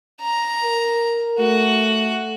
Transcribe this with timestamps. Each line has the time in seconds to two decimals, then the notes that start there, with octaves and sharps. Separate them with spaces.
0.22 A#5
0.63 A#4
1.39 A3 F#4 F#5